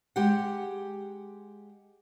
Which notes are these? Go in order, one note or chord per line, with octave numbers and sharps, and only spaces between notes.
G#3 G4 F#5